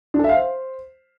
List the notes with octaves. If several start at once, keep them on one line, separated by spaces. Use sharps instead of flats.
D4
A4
E5
F5
C5